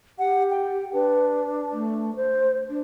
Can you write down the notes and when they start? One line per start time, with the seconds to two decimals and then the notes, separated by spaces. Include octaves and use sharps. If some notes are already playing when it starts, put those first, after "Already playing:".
0.19 G4 F#5
0.50 G5
0.93 D4 B4
1.72 A3
2.16 C5
2.69 D4